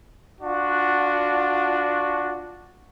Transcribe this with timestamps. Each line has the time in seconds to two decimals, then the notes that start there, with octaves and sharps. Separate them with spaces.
0.42 D4 F4 F#4